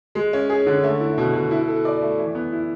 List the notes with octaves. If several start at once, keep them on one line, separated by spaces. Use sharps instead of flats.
G#3
C#4
G#4
D3
A3
E4
B2
B2
E4
A4
D5
A3
E3
B3
E4